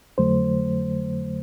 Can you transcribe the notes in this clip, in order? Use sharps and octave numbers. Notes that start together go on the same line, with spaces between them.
F2 D3 F#3 A3 C5